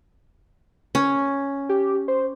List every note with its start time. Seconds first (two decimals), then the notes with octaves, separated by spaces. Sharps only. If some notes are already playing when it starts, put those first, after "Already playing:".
0.95 C#4
1.69 G4
2.08 C5